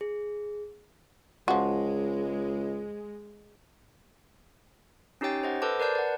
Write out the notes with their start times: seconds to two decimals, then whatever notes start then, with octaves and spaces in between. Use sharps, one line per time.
0.01 G#4
1.48 C#2 F3 G#3 F#4
5.21 C#4 D#4 G4 C#5 G5 A6
5.43 C5 D#5 F#5
5.62 A4 B4 C5 A5 D6
5.80 A#4 B4 D5 A5 G6
5.95 D5 F#5